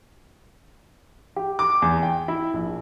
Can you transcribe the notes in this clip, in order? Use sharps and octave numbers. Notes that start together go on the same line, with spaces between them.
G4
D6
E2
G5
E4
A#1